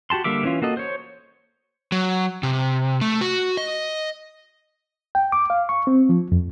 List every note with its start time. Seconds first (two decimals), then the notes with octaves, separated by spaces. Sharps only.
0.10 F#4 G4 A5 C6
0.24 D3 G3 A#3 E5 D6
0.43 E3 C#4 F4
0.62 A#3 F#4 A4 D#5
0.77 C5 C#5
1.92 F#3
2.43 C3
3.01 A3
3.21 F#4
3.57 D#5
5.15 G5
5.32 D6
5.50 F5
5.69 C#6
5.87 C4
6.09 F3
6.32 F2